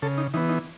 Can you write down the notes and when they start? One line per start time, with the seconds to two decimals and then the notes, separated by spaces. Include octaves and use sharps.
0.02 C#3 A4
0.18 D#4
0.34 E3 D#4
0.37 B3
0.49 D#4